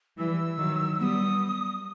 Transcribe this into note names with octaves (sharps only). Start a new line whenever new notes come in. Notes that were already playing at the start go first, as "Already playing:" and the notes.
E3 G3 E6
D#3 F#3
G3 B3 D#6 E6